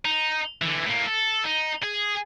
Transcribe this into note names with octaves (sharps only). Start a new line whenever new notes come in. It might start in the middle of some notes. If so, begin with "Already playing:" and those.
D#4
D3 E3
A2 A#3
A4
D#4
G#4